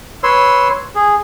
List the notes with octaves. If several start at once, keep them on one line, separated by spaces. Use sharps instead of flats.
B4 C#5 C6 E6
G#4